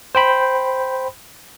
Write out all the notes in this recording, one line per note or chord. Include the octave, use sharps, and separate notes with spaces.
C5 G5 B5